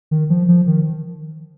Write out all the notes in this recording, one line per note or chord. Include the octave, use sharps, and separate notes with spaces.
D#3
F3
F3
D#3